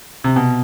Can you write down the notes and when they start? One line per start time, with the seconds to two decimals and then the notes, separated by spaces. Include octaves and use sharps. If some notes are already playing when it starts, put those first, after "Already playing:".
0.24 C3
0.36 B2